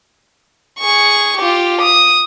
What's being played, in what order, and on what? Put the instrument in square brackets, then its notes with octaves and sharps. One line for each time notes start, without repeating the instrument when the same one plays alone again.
[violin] G#4 C#6
F4 G4
D#6